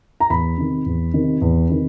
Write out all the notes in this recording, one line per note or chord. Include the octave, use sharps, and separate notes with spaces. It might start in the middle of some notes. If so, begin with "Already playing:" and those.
A#5
E2 B5
C3 D#3
E2
C3 D#3
E2
C3 D#3